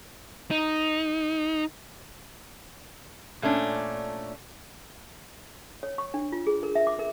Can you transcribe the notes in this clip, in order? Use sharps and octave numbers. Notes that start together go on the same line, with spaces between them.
D#4
A#2 A3 C#4 D4
C#5
C#6
D4
F4
G#4
A#4
E5
D6
A#4